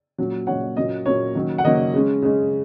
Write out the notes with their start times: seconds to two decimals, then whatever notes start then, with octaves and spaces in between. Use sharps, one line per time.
0.18 A#2 F#3 C#4
0.47 A#2 F#3 C#4 C#5 F#5
0.77 A#2 F#3 A#3 C#4 D#5
1.06 A#2 F#3 A#3 C#4 C#5
1.35 D#3 F#3 A#3 C#4
1.58 F#5
1.64 D#3 F#3 A#3 C#4 D#5
1.94 C#3 G#3 C#4
2.22 C#3 G#3 C#4